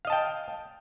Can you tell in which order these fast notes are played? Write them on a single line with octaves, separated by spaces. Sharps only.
F5 D#5 A5 G5